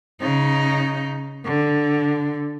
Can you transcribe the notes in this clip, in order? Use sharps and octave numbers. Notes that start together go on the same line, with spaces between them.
C#3 D#4
D3